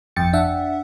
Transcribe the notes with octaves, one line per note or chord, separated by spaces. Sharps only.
G1 F2 G5 A6 C#7
D4 E5 F#5